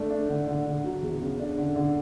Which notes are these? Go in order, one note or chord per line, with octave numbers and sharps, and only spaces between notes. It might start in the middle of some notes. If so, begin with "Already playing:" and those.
Already playing: A3 D4
D4
D3
D3
D3
F#3
E2
C#3
D4
D3
D3